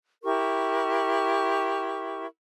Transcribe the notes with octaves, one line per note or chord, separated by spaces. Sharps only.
E4 G4 A#4 C#6